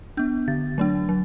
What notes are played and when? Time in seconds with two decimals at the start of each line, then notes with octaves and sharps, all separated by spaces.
0.17 B3 D4 G6
0.48 D3 A6
0.78 F#3 A3 D4
1.09 F#3